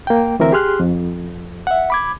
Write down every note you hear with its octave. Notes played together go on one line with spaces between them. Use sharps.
A#3 G5
D2 E3 C4 A#4 E5
G4 G#4 C6 F6 F#6
F2
E5 F#5
B5 D6 G#6